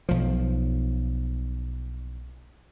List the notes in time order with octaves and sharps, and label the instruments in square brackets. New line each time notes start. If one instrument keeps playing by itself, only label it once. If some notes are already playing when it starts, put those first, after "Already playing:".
[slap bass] B1 F3